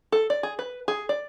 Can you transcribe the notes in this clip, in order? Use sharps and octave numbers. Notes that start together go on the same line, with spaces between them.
A4
D5
G#4
B4
G#4
D5